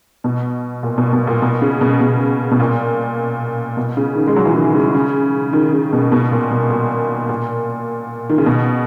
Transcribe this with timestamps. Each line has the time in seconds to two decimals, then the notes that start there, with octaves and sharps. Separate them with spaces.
0.24 B2
0.83 A#2
0.98 B2
1.13 B2
1.27 A#2
1.42 B2
1.62 C#3
1.81 B2
2.01 B2
2.51 B2
2.60 A#2
3.77 B2
3.97 C#3
4.16 D#3
4.27 G#3
4.36 F#3
4.45 E3
4.55 D#3
4.66 D#3
4.74 C#3
4.95 C#3
5.53 D#3
5.73 C#3
5.93 B2
6.12 B2
6.31 A#2
6.51 B2
6.70 A#2
7.29 A#2
8.29 D#3
8.38 C#3
8.46 B2